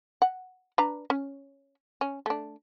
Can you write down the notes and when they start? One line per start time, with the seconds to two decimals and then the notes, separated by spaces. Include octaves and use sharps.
0.22 F#5
0.78 D4 B4 A#5
1.10 C#4
2.01 C#4
2.26 A3 D4